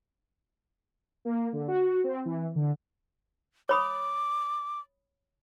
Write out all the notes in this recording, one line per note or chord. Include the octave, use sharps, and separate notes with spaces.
A#3
D3
F#4
C4
E3
D3
C#5 B5 D6 D#6